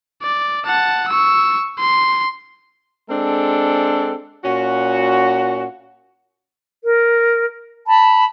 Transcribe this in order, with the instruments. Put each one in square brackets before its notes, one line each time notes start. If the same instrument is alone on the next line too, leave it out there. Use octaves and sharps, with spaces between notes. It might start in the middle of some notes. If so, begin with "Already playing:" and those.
[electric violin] D5
F#5 A5
C#6 E6
C6
[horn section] G#3 C4 D4 A4
A#2 C#4 F#4
[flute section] A#4
A5 B5